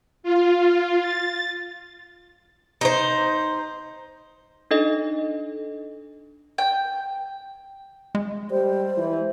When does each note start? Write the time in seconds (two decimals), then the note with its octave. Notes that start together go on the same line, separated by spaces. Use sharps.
0.23 F4
1.01 A6
2.81 D#4 C5
4.71 D4 D#4 A4 D#5
6.58 G5
8.15 G#3
8.51 G3 C5
8.97 E3